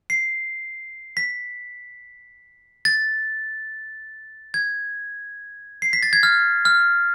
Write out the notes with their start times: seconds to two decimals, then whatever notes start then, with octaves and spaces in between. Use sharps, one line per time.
0.10 C7
1.17 B6
2.85 A6
4.54 G#6
5.82 C7
5.93 B6
6.03 A6
6.13 G#6
6.23 F6
6.65 F6